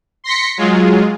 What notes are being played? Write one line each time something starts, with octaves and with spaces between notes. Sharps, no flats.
C6 A#6 B6 C#7
F#3 G#3 F4 G#4